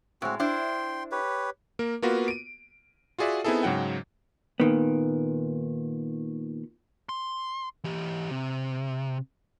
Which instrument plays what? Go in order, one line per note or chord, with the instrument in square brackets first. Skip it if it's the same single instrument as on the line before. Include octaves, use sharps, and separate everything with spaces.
[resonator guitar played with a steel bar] A2 G#3 [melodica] C4 F#4
[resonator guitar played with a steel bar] D4 E4 C5 [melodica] G5 C6
[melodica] G4 B4 C#5
[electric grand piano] A#3 A#4
A#3 B3 F4 F#4 A#4 B4
D7 D#7
F4 F#4 G#4 D5 E5 F#5
B3 C4 D#4 E4 G#4 A4
G#2 C#3 F#3 F#5 G5
[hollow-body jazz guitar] A#2 D#3 B3
[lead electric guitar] C6
E3 G4
C3